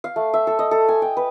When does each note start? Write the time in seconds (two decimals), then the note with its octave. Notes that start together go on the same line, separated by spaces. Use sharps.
0.04 F5
0.16 A3
0.34 E5
0.47 A4
0.59 D#5
0.71 A4
0.89 G#5
1.02 G5
1.17 B4